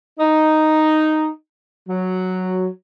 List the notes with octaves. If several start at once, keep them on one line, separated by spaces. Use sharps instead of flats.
D#4
F#3